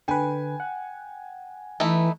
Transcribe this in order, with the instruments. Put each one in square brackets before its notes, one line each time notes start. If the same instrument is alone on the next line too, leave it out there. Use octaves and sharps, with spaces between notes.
[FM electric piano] D3 B4 [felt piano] G5 G#5
[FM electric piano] F#5
[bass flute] E3 [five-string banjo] A3 D#4 E4